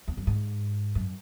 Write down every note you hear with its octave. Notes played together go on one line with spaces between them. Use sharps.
E2
F#2
G#2
F#2